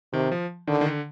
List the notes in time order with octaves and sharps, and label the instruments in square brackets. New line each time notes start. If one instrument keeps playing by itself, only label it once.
[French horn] C3 [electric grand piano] D#3
[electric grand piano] F3
[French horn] D3 [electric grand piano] D#3
[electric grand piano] D#3
D3